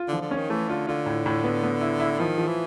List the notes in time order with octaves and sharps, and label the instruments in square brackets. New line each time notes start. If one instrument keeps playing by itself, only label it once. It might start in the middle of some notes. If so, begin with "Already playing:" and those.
Already playing: [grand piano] F4
[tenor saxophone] D3
[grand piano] F3
[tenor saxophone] D3
[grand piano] C#4
[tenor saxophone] D#3
[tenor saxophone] E3 [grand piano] A3
[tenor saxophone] D3 [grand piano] F4
[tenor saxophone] D3 [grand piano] F4
[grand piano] A2
A2
B3
B3
E4
E4
[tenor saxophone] D#3 [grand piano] F3
[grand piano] F3
[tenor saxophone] E3